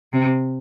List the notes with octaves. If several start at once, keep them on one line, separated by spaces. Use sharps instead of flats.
C3